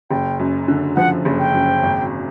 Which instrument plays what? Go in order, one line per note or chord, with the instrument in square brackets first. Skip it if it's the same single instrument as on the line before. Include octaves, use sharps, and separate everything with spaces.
[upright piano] F#1 [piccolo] G5
[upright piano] F#2
D3
[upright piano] F3 [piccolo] F#5
[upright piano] F#1
[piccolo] G5
[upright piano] F#2
G#1